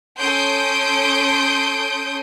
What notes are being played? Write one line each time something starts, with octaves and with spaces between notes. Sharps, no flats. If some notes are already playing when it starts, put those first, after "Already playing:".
C#4 A4 C6 D#6 G6 D7